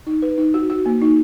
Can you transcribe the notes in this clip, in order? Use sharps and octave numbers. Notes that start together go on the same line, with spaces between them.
D#4
B4
D#4
F#4
F#4
A#3
D#4